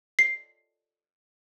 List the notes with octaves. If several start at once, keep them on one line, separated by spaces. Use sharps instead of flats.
C7